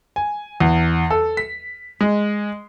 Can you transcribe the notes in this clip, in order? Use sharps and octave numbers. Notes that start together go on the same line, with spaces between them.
G#5
E2
A4
B6
G#3